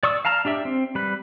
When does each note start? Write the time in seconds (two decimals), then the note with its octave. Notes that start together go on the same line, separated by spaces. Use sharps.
0.03 D5 C#6 D#6 E6
0.25 F5 A5 A#5 F6
0.45 D4 G4 D5 E5
0.65 C4
0.95 G3 B4